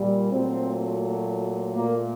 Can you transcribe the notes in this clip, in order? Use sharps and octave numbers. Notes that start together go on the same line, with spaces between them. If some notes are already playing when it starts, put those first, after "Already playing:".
Already playing: A#2 G3
A#2 F#3 A3 C4
A#2 A3 A#3